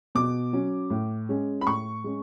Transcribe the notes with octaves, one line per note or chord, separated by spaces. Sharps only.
B2 D6
F#3 C#4
A2
G#3 C#4
B5
A2 C#6
G#3 C#4